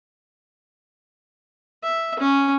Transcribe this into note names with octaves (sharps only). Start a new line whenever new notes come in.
E5
C#4